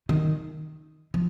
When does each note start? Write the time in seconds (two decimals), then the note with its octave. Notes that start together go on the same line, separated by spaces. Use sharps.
0.09 D#3
1.14 F3